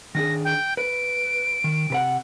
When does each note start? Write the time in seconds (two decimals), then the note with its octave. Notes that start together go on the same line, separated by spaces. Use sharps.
0.15 D#3 D4 G#4 A#6
0.44 G5
0.77 B4 D7
1.64 D#3
1.90 C3 B4 F#5